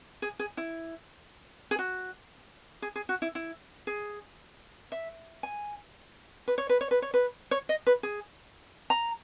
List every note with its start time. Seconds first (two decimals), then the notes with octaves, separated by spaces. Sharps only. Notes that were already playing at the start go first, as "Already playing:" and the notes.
0.22 G#4
0.39 G#4
0.57 E4
1.71 G#4
1.79 F#4
2.82 G#4
2.96 G#4
3.09 F#4
3.22 E4
3.35 E4
3.87 G#4
4.92 E5
5.43 G#5
6.48 B4
6.58 C#5
6.69 B4
6.81 C#5
6.91 B4
7.02 C#5
7.14 B4
7.51 C#5
7.69 D#5
7.87 B4
8.03 G#4
8.90 A#5